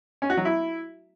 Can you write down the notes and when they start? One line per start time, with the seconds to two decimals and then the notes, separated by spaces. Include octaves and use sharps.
0.22 C#4
0.30 F#4
0.37 F#3
0.45 E4